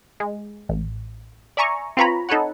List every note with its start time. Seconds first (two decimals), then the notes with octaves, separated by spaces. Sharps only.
0.20 G#3
0.69 A1
1.57 D5 E5 G#5 A#5 C#6
1.97 C4 F4 B4 C#5 A#5 B5
2.29 D#4 A4 B4 C#5 F#5